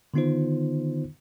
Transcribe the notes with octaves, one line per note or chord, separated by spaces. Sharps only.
D3 D#3 B3 D#4 F4 C5